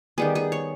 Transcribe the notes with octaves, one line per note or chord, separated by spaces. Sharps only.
D#3 G3 B3 G#4
G#4
C#5